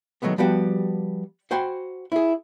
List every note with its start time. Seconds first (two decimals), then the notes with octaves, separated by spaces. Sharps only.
0.22 D#3 F#3 G#3 A3 B3
0.38 F3 G3 B3 F#4 G4
1.51 F#4 C5 G5 G#5 B5
2.12 E4 G#4